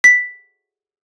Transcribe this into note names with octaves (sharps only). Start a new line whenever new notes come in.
B6